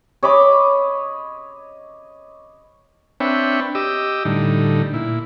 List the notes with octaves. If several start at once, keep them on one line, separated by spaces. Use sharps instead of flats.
C#5 D#5 B5 D6
C4 D4 B4 C#5 E5 G5
G4 D#5 D6 E6
A2 D3 G3 D#4
A#2 E4